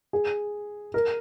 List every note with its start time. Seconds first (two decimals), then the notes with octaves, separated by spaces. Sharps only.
0.13 G#4
0.94 A#4